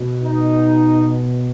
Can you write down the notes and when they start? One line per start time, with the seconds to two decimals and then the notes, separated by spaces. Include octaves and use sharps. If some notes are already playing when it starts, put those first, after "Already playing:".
Already playing: B2
0.24 D#4